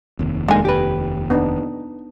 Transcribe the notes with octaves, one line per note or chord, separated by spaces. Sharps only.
F1 D#2
D3 G#3 A#3 D#4 G#5
G4 B4
B3 D4 D#4